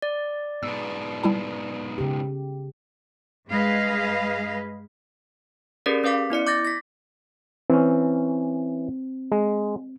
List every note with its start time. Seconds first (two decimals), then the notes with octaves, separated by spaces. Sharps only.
0.02 D5
0.63 G#2 B2 B3 E6
1.23 G3 E4 A5
1.98 C#3 G4
3.49 G2 G#3 G#4 B4 D#5 F5
5.86 C#4 G4 G#4 A#4 B4 D5
6.04 C#4 B4 F5 D6 B6
6.30 B3 E4 D5 C#7
6.47 D6 G6 A6 A#6
6.65 A#6 B6
7.70 E3 C4 C#4
9.32 G#3